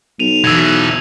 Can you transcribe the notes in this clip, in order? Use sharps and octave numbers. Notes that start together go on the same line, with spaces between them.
B1 D#7 F7
B2 E3 E6 G#6